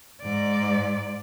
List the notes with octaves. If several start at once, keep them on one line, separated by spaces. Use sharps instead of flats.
G#2 D5